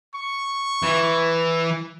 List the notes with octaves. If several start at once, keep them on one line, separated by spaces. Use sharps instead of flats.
C#6
E3